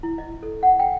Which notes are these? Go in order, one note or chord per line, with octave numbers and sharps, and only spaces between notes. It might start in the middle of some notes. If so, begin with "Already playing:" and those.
E4
D#5
A4
F#5
G5